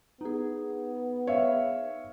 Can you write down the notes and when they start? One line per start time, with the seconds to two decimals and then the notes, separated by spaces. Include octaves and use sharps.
0.21 B3 D#4 G#4
1.27 C#5 E5 F5